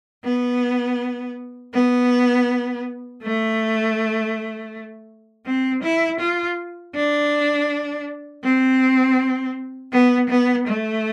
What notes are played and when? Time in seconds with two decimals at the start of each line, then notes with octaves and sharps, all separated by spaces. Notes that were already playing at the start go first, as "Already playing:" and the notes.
0.25 B3
1.74 B3
3.22 A3
5.46 C4
5.83 E4
6.20 F4
6.95 D4
8.44 C4
9.92 B3
10.29 B3
10.67 A3